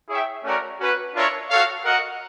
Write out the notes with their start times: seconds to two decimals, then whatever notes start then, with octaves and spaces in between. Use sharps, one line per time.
0.09 E4 G#4 C#5 E5 G5
0.44 A3 C#4 F#4 A#4 D5
0.79 C#4 F#4 B4
1.13 D4 F4 A#4 C#5 E5
1.49 F#4 A4 C#5 F5
1.84 F#4 A#4 D#5 F#5